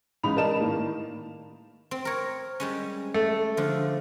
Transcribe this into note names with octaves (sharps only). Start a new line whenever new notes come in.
A1 C#3 G#3 D#4 B5 F7
A#4 D5 D#5 A5 E7
A2 D#3 A#3
C4
A#4 C#5
G3 G#3 C#4
A3
D3 F3